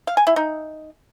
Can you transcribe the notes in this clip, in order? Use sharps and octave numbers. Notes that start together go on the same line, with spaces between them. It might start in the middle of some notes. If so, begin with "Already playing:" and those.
F5
G#5
E4
D#4